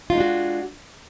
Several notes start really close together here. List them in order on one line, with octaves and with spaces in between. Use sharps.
F4 D#4 G#3 D4 F#4